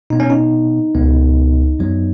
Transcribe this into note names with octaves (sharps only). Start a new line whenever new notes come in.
B2 B3 D#4
C#4
D#4
C#2 B2 B3
F#2 F#3 B3